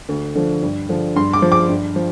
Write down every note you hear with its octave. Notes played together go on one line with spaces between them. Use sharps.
D2
D3 F3
G2
D3 F3
G2 C6
D6
F3
D6
G2
F3